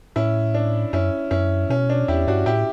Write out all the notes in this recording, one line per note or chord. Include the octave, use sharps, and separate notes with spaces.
A2 C#4 E4
D4
F#2 C#4 E4
F#2 C#4 E4
B2 C#4
D4
E2 E4 G4
G2 D4 F#4
A2 E4 G4